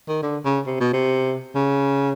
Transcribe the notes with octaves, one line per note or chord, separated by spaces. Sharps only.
D#3
D3
C#3
C3
B2
C3
C#3